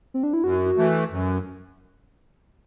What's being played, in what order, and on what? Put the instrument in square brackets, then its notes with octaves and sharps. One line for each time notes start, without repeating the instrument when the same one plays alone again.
[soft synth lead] C4
D4
E4
[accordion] F#2 [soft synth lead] F#4
[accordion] E3 A3
F#2